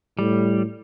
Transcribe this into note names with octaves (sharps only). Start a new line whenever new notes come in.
A2 G3